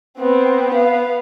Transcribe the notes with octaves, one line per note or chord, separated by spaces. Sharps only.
B3 C4
B3 F5